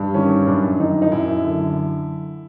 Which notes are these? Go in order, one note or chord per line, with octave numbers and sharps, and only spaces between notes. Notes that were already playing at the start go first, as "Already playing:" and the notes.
Already playing: G2
D#3 C#4
F#2 D4
D#3 D#4
D#4
F#2 E4
D3